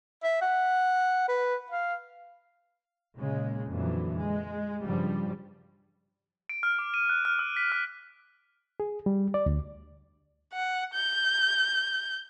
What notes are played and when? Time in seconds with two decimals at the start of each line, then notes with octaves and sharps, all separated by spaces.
0.23 E5
0.41 F#5
1.28 B4
1.70 F5
3.15 A#2 C#3 G#3
3.70 F2 A#2 D3 E3 F#3
4.18 G#3
4.84 G2 C#3 F3 G3
6.49 D7
6.63 F6
6.79 D6
6.94 D#7
7.09 F#6
7.25 F6
7.39 E6
7.57 B6
7.72 F6
8.80 G#4
9.06 G3
9.34 D5
9.46 D2
10.53 F#5
10.94 G6